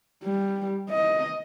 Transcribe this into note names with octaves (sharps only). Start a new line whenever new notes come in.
G3
D#5